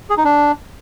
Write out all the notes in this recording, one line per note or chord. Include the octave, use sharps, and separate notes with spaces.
G#4
D#4
D4